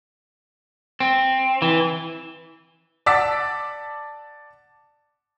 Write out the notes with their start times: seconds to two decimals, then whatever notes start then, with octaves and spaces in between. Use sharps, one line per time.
1.00 C4
1.62 E3
3.06 D5 F#5 A5 D6 E6 B6